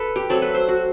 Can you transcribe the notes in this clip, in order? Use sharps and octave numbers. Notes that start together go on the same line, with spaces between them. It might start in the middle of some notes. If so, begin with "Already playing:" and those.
Already playing: A4 B4
G4
F#3 A3 C4 A4
B4
C5
F#4